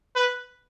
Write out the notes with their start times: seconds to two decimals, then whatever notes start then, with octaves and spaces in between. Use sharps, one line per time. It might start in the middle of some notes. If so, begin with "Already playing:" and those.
0.16 B4